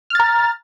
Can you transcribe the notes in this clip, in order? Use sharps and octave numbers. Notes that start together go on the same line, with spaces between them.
A#5 F6 A6